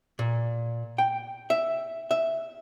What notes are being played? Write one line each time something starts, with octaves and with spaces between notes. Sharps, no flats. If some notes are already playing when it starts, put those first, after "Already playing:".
A#2
G5
E5
E5